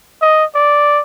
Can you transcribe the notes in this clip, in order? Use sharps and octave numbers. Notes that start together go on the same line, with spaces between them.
D#5
D5